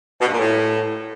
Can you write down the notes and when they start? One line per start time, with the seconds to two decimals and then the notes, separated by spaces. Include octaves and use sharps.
0.21 B2
0.27 G2
0.33 A#2
0.38 A2